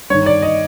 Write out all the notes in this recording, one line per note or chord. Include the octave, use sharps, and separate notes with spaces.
G2 D#3 C#5
D5
D#5